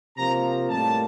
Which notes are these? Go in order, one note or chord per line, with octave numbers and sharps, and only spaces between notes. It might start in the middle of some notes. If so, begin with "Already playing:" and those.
C3 F3 A#3 A#5
A2 G3 A#3 A5